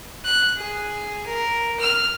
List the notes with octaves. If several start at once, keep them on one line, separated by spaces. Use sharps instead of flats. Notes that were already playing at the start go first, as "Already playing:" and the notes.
F#6
G#4
A#4
F6